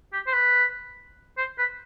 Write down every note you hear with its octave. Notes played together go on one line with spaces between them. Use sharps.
G4
C5
B4
C5
B4